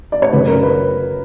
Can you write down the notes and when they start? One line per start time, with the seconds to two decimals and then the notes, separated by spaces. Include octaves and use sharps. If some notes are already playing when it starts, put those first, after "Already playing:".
0.12 D5
0.22 C#5
0.32 F#2 C#3 F#3 B4
0.47 A#4
0.63 B4